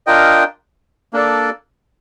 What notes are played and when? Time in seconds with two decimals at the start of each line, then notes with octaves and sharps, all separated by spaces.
0.07 D4 F4 A#4 D#5 G5
1.13 A#3 D4 A4 D5